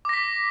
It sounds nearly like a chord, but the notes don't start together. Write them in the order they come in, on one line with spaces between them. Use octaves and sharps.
D6 A#6 B6